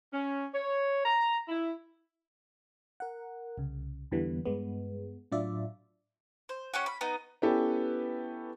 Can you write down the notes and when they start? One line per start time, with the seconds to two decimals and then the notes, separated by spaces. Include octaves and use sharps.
0.13 C#4
0.54 C#5
1.04 A#5
1.49 E4
3.00 A#4 F#5
3.58 C2 C#3
4.11 E2 D3 E3 G3 B3
4.46 G2 G#3 B3
5.32 A2 F#3 D4 F4 D5 E5
6.49 C5
6.74 C#4 G4 F#5
6.86 B5
7.01 B3 D#4 D#5
7.42 B3 C#4 E4 G4 A4 B4